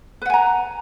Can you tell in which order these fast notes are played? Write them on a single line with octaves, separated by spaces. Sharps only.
B4 F#5 G#5 A#5